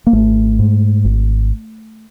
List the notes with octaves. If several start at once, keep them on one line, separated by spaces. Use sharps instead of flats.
A#3
G#1 A3
G#2
G#1